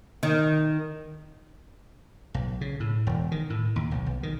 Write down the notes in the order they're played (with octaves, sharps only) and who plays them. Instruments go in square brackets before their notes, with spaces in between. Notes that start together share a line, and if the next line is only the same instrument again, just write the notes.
[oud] D#3
[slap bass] B1
C#3
A2
E1
D#3
A2
D#2
B1
B1
D#3